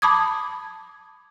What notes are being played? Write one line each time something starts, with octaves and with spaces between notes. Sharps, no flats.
A5 B5 D6 D#6 G#6